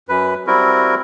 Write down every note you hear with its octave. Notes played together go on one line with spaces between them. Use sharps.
F#2 B4
G3 C4 E4 F#4 A#4